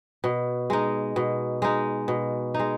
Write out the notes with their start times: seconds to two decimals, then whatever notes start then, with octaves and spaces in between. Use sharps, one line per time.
0.24 B2
0.70 G#3 D#4
1.16 B2
1.62 G#3 D#4
2.08 B2
2.54 G#3 D#4